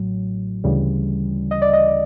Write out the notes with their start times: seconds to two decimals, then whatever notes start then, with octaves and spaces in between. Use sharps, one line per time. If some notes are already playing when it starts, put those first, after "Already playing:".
Already playing: A1 A2 F#3
0.64 D2 C#3 E3 G3
1.51 D#5
1.62 D5
1.73 D#5